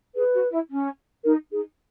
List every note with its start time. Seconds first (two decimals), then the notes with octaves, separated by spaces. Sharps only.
0.15 G#4 B4
0.33 F#4
0.51 E4
0.70 C#4
1.24 D#4 A#4
1.52 D#4 G#4